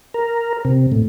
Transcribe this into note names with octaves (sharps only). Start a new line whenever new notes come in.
A#4
C3
A2